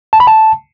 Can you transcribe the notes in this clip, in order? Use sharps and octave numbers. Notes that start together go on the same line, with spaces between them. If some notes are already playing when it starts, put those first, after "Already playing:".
A5
B5
A5